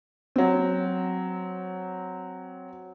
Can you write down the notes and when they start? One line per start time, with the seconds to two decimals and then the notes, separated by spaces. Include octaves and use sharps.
0.36 F#3 C4